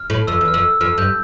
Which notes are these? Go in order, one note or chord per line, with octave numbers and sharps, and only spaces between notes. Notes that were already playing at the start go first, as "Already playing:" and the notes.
Already playing: F6
A2
F2 E6
E2
F6
F2 E6
F2 F6
G2 G6